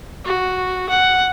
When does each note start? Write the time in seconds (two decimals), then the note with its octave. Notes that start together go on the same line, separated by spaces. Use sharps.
0.25 F#4
0.89 F#5